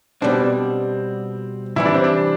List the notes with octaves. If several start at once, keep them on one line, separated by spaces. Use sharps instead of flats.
B2 G3 C4 D4
C3 E3 G3 E4
D4
C4
D4